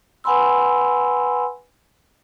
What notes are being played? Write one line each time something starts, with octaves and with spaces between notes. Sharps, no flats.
B4 F#5 G#5 B5 C6 E6